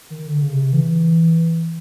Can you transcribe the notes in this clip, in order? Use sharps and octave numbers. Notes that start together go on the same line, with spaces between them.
D#3
D3
C#3
C3
C#3
E3